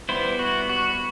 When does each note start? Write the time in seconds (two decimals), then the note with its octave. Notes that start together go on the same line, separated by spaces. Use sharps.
0.09 G3 B3 E4 C5
0.39 F#4
0.69 F#4